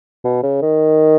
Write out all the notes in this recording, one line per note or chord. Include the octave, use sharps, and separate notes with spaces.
B2
C#3
D#3